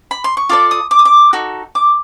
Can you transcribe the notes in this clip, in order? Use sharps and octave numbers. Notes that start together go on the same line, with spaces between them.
B5
C6
C#6
F4 A4 D5 D6
D#6
D6
D#6
D6
D#4 F#4 A4
D6